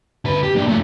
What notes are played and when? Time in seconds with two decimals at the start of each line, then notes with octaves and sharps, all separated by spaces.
0.25 D3 B4
0.43 G4
0.55 A#3 D4
0.69 A3 F4